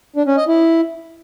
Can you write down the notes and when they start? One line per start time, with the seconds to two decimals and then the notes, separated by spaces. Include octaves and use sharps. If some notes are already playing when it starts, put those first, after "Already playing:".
0.16 D4
0.27 C#4
0.37 D#5
0.47 E4